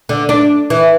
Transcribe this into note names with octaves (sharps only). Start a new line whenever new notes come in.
D3
D4
E3